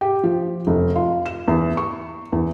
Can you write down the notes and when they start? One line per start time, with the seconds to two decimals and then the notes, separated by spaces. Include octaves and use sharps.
0.01 G4
0.23 F3
0.67 F1
0.96 F4
1.26 E7
1.48 E2
1.77 C#6
2.32 E2